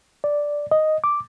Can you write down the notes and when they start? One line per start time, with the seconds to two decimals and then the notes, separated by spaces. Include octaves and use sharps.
0.24 D5
0.71 D#5
1.04 D6